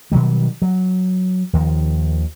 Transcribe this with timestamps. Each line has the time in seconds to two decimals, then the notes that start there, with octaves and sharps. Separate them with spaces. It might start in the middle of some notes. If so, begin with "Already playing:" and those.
0.12 B2 D#3 F#3 G3
0.62 F#3
1.53 D#2 D#3 F3